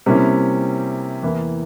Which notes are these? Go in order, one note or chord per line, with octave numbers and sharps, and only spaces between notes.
C3 G3 A#3 C#4 E4
E2 E3 A#3 E4